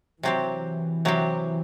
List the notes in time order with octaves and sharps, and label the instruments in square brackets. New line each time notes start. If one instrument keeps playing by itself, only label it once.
[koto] C3 F#3 C4 G4 [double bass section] E3
[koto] C3 F#3 C4 G4